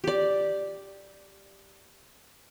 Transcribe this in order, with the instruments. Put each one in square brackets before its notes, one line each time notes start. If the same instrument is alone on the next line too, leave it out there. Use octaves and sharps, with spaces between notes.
[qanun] G4 D5